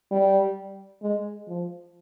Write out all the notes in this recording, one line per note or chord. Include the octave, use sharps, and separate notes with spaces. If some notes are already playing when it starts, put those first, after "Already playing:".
G3
G#3
F3